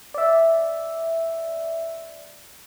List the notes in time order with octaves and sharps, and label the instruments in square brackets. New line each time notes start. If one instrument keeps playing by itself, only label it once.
[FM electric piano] D5 E5